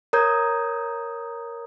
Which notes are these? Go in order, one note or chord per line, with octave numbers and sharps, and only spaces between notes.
A#4 C#5 A#5 D#6 G6 G#6